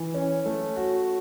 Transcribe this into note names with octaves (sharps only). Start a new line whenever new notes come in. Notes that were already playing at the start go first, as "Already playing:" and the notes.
Already playing: E3
C#4
A3
F#4